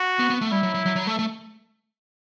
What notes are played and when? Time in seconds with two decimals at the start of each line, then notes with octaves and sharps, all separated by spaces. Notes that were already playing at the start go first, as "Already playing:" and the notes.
Already playing: F#4
0.19 B3
0.30 B3
0.41 A3
0.52 G3 E4
0.63 F#3
0.74 F#3
0.86 F#3
0.96 F#3
1.07 A3
1.19 A3